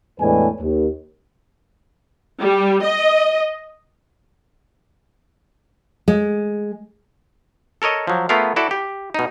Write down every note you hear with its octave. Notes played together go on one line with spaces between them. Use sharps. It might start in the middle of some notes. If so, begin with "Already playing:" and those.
E2 A2 G#3 D4 B4 G#5
D#2
G3
D#5
G#3
A4 A#4 C#5 D#5
F3 F#3
A3 B3 F4 G#4 A#4 F5
E4 F#4 A4 D5
G4
B2 D#4